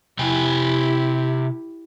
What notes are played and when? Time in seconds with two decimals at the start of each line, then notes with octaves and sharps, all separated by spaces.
0.19 C3 E4 G4 G5 G#5